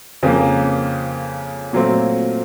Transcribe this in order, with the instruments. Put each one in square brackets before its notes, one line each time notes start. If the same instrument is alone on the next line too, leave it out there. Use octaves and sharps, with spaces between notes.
[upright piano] F2 C#3 F3 A#3
A#2 F#3 A3 C4 F4